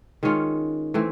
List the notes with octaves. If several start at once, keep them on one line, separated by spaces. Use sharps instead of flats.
D#3 G#3 C#4 F4
E3 A3 C4